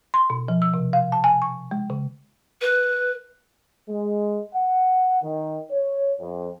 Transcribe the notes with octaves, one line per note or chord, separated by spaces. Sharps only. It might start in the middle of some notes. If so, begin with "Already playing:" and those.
C6
B2
F3
E6
C3
F5
A5
G#5
C#6
G#3
C#3
B4
G#3
F#5
D#3
C#5
F2